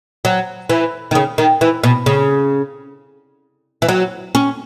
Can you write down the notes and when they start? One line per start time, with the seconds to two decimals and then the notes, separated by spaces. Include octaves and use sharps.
0.25 F#3
0.70 E3
1.11 D#3
1.15 C#3
1.38 D#3
1.61 E3
1.84 B2
2.06 C#3
3.82 E3
3.89 F#3
4.35 C#4